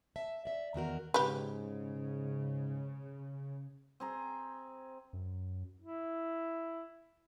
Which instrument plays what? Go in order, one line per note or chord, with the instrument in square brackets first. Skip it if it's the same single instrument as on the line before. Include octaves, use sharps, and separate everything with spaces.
[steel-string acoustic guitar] E5 A5
D5 E5
E2 D#3 F#4 A#4
[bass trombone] G#2 [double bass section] C#3 [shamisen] G4 B4
[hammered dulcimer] C4 G#4 A#5
[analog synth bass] F#2
[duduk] E4